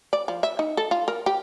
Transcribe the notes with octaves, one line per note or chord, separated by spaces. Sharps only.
D5
F3
E5
D#4
A4
F4
A#4
G4